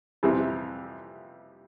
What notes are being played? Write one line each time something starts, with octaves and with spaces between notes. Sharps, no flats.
F2 C3 E3 G3